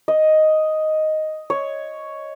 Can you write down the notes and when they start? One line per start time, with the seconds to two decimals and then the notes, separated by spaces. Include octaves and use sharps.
0.08 D#5
1.50 C#5